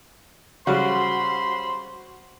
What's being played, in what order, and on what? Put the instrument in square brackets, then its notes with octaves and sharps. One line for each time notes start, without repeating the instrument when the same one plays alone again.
[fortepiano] C#3 F#3 G3 [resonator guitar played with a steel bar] F#4 [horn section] C5 B5 C6